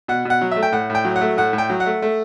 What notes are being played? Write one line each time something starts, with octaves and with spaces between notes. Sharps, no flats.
B2 F#5
B2 F#5
F#3
A3 E5
G5
A2 F#5
A2
G5
F#3
F#5
A3
A2 F#5
A2
G5
F#3
F#5
A3
A3